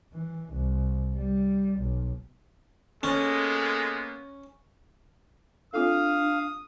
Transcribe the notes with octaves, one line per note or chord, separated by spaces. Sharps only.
E3
C2
G3
B1
G#3 A#3 B3 C#4 A4
C4 D4 F4 A4 F5 D#6